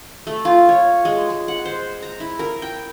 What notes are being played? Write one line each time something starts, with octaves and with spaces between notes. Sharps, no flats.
A3
F4
C#5
G#3
G#3
F#5
C5
A#5
E4
A#4
G5